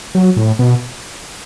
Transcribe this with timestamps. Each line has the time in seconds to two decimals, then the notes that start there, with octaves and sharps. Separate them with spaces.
0.15 F#3
0.37 A2
0.59 B2